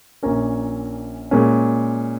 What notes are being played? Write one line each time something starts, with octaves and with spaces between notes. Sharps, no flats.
A#1 A#2 A#3 C#4 A#4
A#2 G#3 C#4